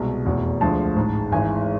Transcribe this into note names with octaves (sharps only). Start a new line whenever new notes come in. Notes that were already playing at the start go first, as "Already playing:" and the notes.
Already playing: C2 B2 G#3
F1 E2 B2
D2 D3 F3 G#3 A5
A1 G#2 G#3
G#1 G#2 E3 G#3 G#5